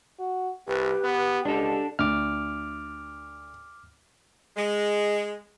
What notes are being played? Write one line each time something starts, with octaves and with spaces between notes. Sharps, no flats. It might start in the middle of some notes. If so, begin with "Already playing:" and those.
F#4
C2 G4 B4
B3
C#2 G#3 D4 G4 A4
D2 D6 F6
G#3